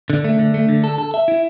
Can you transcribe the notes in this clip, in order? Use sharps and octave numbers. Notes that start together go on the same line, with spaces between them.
D3
A3
D3
A3
D3
A4
A4
E5
E4